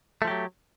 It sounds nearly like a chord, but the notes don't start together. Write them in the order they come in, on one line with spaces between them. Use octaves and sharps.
A3 F3 G4 F#3